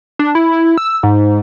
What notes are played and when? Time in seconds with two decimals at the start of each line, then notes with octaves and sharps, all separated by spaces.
0.19 D4
0.35 E4
0.77 E6
1.03 G#2